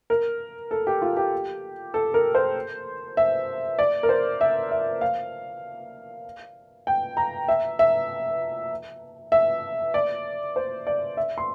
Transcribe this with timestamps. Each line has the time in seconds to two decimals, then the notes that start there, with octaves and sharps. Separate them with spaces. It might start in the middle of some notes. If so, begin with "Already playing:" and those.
0.10 A#4
0.71 A4
0.87 G4
1.02 F4
1.17 G4
1.94 A4
2.14 A#4
2.35 C5
3.17 E5
3.79 D5
4.03 A#4
4.09 C5
4.41 E5
4.71 E5
5.01 F5
6.87 G5
7.17 A#5
7.48 E5
7.79 E5
9.32 E5
9.94 D5
10.56 C5
10.87 D5
11.17 E5
11.38 C6